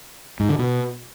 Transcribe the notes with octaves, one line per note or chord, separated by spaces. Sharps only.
G#2
D3
B2